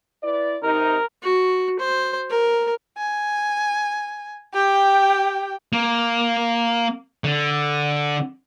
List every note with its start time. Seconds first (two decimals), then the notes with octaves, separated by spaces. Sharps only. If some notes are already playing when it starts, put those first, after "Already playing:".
0.23 E4 B4 D5
0.63 C3 D#4 A#4
1.22 F#4
1.79 C5
2.30 A#4
2.98 G#5
4.54 G4 G5
5.73 A#3
7.24 D3